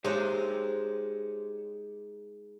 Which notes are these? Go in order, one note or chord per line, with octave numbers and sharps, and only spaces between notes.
G#3 D#4 G4 C5 C#5